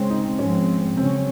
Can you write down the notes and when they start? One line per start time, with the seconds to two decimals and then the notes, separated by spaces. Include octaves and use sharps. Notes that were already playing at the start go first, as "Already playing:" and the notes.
Already playing: C#3 G#3 C4 C#4
0.10 D#4
0.39 G#2 F3 G#3 C4 C#4
0.97 C#3 F#3 C4 C#4